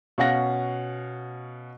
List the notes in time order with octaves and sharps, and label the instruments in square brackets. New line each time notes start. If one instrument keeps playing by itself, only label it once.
[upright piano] B2 C#4 F5 F#5 A#6